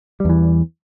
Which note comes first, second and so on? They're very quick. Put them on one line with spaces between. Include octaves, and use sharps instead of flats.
G3 E2 E3